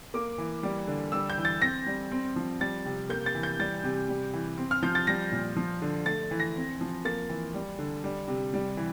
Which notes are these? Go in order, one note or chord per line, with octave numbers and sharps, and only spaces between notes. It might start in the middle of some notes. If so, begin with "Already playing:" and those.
A#3 D6
E3
G3
D3
G3 E6
G6
E3
A6
C4 A#6
G3
C4
F3
G3 A6
C3
A#3 G6
A6
E3
G6
G3 A6
C3
G3
E3
C4
F6
F3 G6
A6
G3 A#6
A#2
F3
D3
A3 A6
E3
A#6
C4
F3
A#3 A6
E3
G3
D3
G3
C3
G3
E3